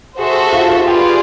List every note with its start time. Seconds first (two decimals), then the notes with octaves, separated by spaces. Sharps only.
0.19 F#4 G#4 A4 C5 E5
0.36 G4
0.52 F4
0.69 F4
0.86 F4 G4 G#4 B4 D5